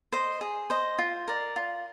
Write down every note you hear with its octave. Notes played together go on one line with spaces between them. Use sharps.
C5 D#5
G#4
C5 D#5
F4
A#4 D5
F4